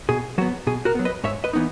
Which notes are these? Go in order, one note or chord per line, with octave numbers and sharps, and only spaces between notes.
B2 G#4
F#3 B3 F#4
B2 G#4
F#4 A#4
F#3 B3
B4 D#5
G#2 C#5 E5
B4 D#5
E3 B3 D#4